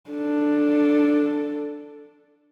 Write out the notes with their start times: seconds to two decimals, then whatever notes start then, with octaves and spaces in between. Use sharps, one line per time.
0.11 D4 A4